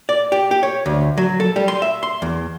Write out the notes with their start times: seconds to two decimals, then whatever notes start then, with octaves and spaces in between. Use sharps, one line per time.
0.09 D5
0.32 G4
0.51 G4
0.63 C#5
0.86 D2
1.18 F#3
1.40 A4
1.56 G3
1.68 C6
1.82 E5
2.03 C6
2.22 E2